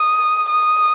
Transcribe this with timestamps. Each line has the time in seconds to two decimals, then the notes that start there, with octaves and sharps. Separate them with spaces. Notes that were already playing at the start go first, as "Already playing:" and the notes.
Already playing: D#6
0.49 D#6